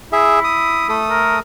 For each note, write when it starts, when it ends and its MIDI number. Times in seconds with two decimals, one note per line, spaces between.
0.13 0.98 64
0.13 0.39 68
0.13 0.39 76
0.44 0.88 87
0.89 1.39 57
0.89 1.39 69
0.89 1.39 87
1.10 1.36 70